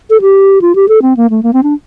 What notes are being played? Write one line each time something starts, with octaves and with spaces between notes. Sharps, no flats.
A4
G4
F4
G4
A4
C4
A#3
A3
A#3
C4
D4